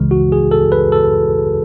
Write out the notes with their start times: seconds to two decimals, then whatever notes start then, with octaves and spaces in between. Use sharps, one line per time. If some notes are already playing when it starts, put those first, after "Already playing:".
Already playing: C#2 C#3 E3 G#3
0.11 F#4
0.32 G#4
0.51 A4
0.72 B4
0.92 A4